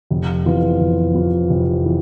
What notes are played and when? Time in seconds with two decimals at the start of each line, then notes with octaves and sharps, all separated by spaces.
0.10 F1
0.45 F2 E3 B3 F4
0.80 F1
1.15 F2 E3 B3 F4
1.50 F1
1.86 E3